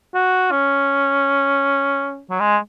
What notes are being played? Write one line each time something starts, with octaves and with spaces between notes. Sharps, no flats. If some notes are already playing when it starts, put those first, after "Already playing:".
F#4
C#4
F#3
G#3